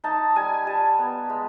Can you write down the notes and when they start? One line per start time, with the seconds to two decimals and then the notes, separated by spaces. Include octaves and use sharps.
0.04 D#4 A5
0.36 G3 G#5
0.67 G3 A5
0.99 B3
1.30 G#3